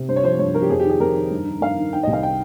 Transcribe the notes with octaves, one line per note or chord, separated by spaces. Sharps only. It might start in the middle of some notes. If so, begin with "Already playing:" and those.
Already playing: C3
G2 C5
C#5
F3 C5
G2 C#5
F3 A#4
G4
F2 G#4
G4
D#3 G#4
F2 A#4
D#3
G2
D#3
G2 F5
D#3
D#3 G5
C2 D#5
F5
G5